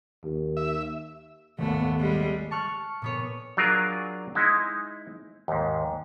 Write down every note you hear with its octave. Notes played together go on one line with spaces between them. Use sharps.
D#2
E5
D#1 G#1 D#2 A3 B3
G3 G#3
A5 C#6 F6 F#6
A#2 B3 C#5
F#3 D4 F4 G#4 A#4
G#3 D#4 E4
D#2 G#2